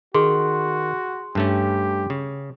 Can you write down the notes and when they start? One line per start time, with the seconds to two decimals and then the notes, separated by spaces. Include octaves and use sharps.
0.15 D#3 F#4 G#4 C6
1.35 G2 A3 C#4 G4
2.10 C#3